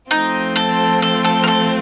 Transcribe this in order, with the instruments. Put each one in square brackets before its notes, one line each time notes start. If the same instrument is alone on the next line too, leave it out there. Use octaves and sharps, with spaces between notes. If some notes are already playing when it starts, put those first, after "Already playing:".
[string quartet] F3 A3 C4 F4 [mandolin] D#4
[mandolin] A4
A4
A4
A#4
A4